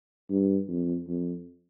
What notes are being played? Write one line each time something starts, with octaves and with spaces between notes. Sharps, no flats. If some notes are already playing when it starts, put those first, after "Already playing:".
G2
F2
F2